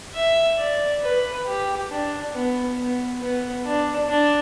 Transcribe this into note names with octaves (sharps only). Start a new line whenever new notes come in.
E5
D5
B4
G4
D4
B3
B3
B3
D4
D4